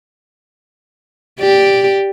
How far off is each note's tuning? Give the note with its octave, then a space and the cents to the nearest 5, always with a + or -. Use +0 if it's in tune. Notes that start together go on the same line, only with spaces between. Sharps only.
G4 +0 D5 +0